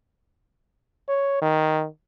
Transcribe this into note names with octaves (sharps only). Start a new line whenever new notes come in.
C#5
D#3